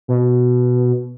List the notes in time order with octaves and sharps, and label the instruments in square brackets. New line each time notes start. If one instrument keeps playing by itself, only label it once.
[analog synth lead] B2